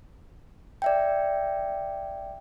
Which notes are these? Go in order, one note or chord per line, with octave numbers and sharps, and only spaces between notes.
D5 E5 G5